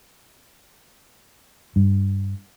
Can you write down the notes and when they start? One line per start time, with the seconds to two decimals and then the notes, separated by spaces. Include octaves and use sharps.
1.76 G2